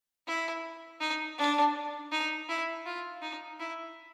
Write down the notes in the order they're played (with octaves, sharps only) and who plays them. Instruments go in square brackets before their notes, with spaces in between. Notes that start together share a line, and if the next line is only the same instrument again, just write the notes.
[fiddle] E4
D#4
D4
D#4
E4
F4
D#4
E4